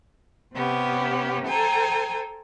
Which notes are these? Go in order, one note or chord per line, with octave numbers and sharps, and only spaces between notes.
C3 B3 C#4 G4
A4 C5 G5 G#5 A#5